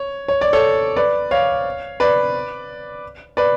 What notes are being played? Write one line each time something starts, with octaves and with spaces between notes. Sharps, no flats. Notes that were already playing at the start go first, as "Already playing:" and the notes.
Already playing: C#5
C#5
D5
A4 C#5
B4 D5
C#5 F5
B4 D5
B4 D5